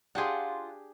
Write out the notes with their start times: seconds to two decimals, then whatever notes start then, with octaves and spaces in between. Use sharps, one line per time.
0.15 D4 F4 G4 G#4 F#5